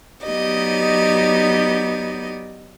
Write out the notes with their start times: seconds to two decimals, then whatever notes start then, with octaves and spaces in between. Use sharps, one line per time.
0.23 F#3 B3 D#4 G4 D5 D#5